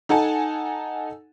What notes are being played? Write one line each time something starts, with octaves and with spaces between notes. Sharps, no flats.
D#4 A4 F#5 G#5 A5